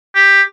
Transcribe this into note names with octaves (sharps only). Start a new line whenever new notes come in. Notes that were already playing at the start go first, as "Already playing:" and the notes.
G4